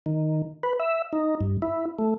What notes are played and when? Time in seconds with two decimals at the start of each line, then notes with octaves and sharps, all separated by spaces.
0.06 D#3
0.63 B4
0.80 E5
1.13 D#4
1.41 G2
1.62 E4
1.99 A3